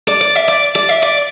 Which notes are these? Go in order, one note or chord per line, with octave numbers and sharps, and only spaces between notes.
D5
D5
E5
D5
D5
E5
D5